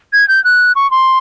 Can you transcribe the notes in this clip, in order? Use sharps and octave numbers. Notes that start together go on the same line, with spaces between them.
G#6
G6
F#6
C#6
C6